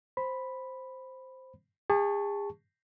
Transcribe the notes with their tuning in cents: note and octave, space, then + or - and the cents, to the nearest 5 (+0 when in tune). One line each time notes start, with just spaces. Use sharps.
C5 +0 B5 +0
G#4 -40 A5 +0 C#6 +0